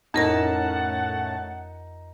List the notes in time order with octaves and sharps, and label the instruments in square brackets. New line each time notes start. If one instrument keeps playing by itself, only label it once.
[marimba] F2 A#4 A#6 [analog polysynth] A2 C#4 A5 [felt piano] D#4 [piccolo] F#5